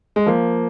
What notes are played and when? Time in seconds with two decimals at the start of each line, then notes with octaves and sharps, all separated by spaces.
0.16 G#3
0.26 F3 A#3